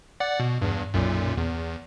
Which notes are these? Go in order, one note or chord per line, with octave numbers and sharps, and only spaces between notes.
D5 F#5
B2
E2 G2
B1 F#2 A#2
E2